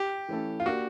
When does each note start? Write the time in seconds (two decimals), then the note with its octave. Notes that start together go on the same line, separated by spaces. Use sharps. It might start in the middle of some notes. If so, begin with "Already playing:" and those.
Already playing: G4
0.29 E3 A3 C#4 E4 A4
0.60 F4
0.65 A#3 D4 F#4 G4 A#4